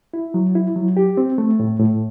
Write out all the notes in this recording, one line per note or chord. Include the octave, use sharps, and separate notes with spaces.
E4
F#3
E4
F#3
G4
C4
A3
A2
A2